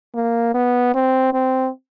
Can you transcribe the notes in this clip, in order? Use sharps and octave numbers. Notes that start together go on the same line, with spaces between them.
A#3
B3
C4
C4